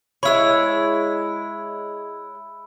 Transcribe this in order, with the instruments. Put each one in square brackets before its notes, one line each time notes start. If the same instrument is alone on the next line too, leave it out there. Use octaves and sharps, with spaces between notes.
[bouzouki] G#3 E4 C#5 [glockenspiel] B5 E6